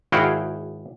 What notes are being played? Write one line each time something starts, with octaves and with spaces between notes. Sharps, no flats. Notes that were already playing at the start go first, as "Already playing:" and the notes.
G#1 E4 F#4 G#4 F5 G5